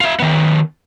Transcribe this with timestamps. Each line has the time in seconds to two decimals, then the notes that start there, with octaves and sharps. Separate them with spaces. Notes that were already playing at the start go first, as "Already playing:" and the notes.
0.01 F4 E5
0.20 D#3 B3